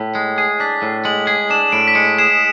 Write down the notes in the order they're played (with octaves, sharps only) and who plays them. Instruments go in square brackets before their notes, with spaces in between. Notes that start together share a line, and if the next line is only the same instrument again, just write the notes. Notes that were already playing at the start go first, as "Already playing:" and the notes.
Already playing: [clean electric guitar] A2 [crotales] B6
[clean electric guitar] G#3
G#4
[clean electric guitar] D4 [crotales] B6
[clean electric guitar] A2
[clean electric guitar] G#3 [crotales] F#7
[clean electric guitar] G#4
[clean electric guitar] D4 [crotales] E7
[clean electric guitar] A2 [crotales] D7
[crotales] B6
[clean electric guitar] G#3 [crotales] C#7
[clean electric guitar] G#4 [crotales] E7